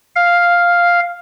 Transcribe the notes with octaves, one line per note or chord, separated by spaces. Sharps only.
F5